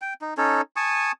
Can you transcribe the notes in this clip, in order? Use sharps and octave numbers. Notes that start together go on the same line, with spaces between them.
G5
D#4
C#4 D#4 A4 C#5
G#5 A5 C#6 D#6